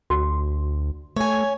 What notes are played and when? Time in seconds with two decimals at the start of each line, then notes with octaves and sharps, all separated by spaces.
0.10 D2 F#4
1.16 A3 C#5 G#5